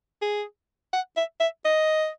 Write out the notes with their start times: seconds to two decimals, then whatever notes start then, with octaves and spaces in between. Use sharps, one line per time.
0.22 G#4
0.93 F#5
1.17 E5
1.40 E5
1.65 D#5